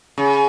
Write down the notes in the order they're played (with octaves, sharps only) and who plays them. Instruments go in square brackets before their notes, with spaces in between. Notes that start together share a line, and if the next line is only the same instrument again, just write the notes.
[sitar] C#3